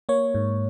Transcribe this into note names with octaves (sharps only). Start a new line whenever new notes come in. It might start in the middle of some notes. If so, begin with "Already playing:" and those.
A#3 C#5
G#2